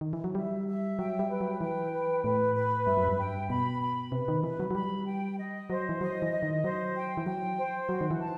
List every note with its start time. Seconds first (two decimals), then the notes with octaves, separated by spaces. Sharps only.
0.01 D#3
0.13 E3
0.24 F#3
0.35 G3 E5
0.67 E5
0.99 F#3 G5
1.19 G3
1.30 B4
1.41 F#3
1.61 E3 G5
1.92 B4
2.24 A2 B4
2.56 B4
2.86 G2 E5
2.97 F#2
3.09 G2
3.18 G5
3.50 B2 B5
3.82 B5
4.12 C3 B4
4.28 D#3
4.43 E3 B4
4.60 F#3
4.71 F#3
4.75 G3 B5
5.06 G5
5.38 D#5
5.70 F#3 C5
5.89 E3
6.01 F#3 D#5
6.22 E3
6.32 D#5
6.43 D#3
6.64 F#3 C5
6.95 G5
7.17 E3
7.26 F#3 G5
7.58 C5
7.89 F#3 F#4
8.01 D#3
8.11 E3
8.20 A5